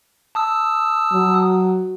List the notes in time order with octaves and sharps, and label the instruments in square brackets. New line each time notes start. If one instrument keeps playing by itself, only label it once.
[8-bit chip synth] A5 D#6 E6
[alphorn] F#3